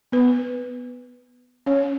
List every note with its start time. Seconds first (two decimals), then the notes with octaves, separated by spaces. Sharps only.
0.12 B3 B4
1.66 C#4 C#5